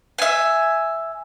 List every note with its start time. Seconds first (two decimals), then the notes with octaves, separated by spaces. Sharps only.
0.18 E5 G#5